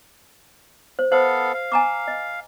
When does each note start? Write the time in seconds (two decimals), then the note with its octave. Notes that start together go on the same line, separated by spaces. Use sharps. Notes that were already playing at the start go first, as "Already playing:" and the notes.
0.99 C5
1.12 B3 A4 C5 F5
1.54 F5
1.72 G#5 A#5 D6
2.08 D#5